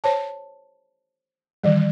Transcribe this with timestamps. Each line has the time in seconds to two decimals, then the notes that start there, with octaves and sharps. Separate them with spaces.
0.04 C5 C#5 A5
1.64 D#3 E3 G3